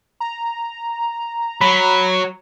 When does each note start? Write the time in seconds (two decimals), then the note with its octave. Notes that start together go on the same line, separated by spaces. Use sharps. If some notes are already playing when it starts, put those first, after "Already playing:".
0.20 A#5
1.61 F#3 B5